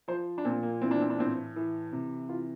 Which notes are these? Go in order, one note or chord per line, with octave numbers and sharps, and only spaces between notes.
F3 C5
D4
A#2 C4
A#3
E3 C4
D4
C4
D4
A2 C4
E3
C3
E3 F4